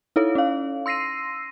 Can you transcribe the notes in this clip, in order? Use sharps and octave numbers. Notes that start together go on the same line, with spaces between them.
D#4 E4 A4 C#5
C#4 F5
C6 E6 A#6 C7 D#7